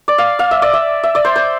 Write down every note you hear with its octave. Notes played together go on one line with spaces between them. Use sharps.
D5
F5
F5
E5
D5
E5
E5
D5
C5
C5